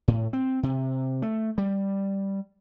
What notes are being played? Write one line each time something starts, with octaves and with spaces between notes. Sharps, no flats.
A2
C4
C3
A3
G3